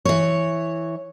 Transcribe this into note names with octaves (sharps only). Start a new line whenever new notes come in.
E3 C#5